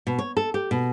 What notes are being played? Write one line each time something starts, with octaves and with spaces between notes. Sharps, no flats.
B2
C#5
A4
G4
B2